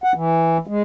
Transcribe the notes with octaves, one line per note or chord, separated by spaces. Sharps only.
F#5
E3
G#3